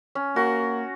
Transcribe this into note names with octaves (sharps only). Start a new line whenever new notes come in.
C#4
A#3 F#4